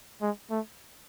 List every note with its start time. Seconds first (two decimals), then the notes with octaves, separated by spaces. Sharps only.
0.22 G#3
0.51 A3